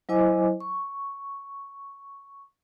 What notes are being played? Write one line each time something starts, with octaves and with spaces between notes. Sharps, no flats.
F#3 E4 C5 D#5 G#5 D6
C#6